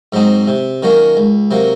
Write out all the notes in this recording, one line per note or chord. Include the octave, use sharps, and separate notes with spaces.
G#2 F#3 C4 D#4
C3
D#3 F#3 A#3 C#4
C#2
C3 F#3 A#3